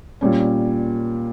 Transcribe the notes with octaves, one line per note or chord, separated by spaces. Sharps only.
A#2 G3 C#4